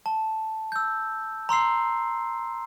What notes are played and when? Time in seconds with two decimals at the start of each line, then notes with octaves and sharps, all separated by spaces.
0.06 A5
0.72 E6 G6
1.49 A#5 C6 E6 C7